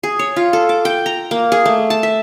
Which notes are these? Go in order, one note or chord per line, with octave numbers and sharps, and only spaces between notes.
G#4
C#5
F4
A4
D6
G5
A#5
A#3
G#4
A3
A5
E5